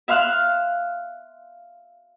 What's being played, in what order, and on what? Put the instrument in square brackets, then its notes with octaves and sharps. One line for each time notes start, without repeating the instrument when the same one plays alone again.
[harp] E5 F5 C6 F6 F#6